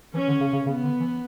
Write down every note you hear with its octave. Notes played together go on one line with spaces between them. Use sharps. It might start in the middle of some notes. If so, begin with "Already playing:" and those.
E3 C#4
D3
C#3
C#3
C#3 B3
D3
E3